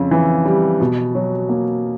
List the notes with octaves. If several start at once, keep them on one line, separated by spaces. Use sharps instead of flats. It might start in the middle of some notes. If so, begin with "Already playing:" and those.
Already playing: F2 C#3
E3
G3
B2
F#3
A#3